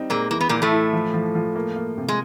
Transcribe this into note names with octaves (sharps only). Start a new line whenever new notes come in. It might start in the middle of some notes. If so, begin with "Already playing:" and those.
Already playing: G3 C4 D#4
A#2 G#3 A#3
E3 A#3
B3
A#2 E3 A#3
A2 A3
E4
F3
F3
F3
A#3
A#3
C3
G#3